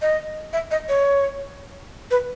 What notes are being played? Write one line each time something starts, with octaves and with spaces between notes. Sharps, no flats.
D#5
E5
D#5
C#5
B4